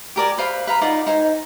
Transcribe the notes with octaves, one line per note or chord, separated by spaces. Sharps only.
G4 A#4 D5 G#5
B4 C5 F5 B5
B4 F5 A#5 B5
D#4 F4 D5 F#5
D#4 C5 G#5